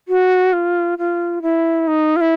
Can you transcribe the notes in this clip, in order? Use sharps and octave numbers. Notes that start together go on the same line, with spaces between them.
F#4
F4
F4
E4
D#4
F4
E4